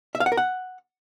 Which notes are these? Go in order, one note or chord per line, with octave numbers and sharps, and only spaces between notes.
E5
F5
F#5
A#4
F#5